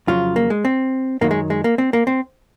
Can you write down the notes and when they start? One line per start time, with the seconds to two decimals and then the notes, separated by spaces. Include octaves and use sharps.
0.07 F2 C#3 F#3 F4
0.36 A#3
0.50 G#3
0.65 C4
1.21 F#2 D#3 F#3 A#3
1.31 G#3
1.50 G#3
1.64 A#3
1.78 C4
1.93 A#3
2.07 C4